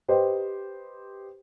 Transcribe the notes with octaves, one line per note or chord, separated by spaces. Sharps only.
G4 B4 C5 D#5